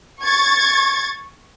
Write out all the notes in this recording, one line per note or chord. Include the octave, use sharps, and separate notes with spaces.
C#6 G#6 A6